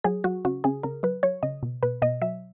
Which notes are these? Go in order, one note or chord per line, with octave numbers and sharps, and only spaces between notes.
F#3 G#4
F#3 F#4
C#3 F#4
C#3 G#4
C#3 A#4
F#3 B4
F#3 C#5
C#3 D#5
B2
B2 B4
B2 D#5
F#3 E5